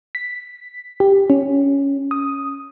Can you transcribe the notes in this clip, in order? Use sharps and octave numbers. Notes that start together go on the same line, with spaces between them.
B6
G4
C#4
D#6